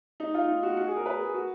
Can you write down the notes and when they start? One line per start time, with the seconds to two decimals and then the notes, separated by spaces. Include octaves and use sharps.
0.20 D#4
0.35 F4
0.48 D#4
0.63 F#4
0.77 F#4
0.87 G#4
0.96 A#4
1.06 B4
1.20 G#4
1.34 F#4